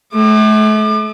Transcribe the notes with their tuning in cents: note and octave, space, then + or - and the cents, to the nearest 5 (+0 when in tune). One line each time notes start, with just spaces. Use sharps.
A3 -40 D6 +35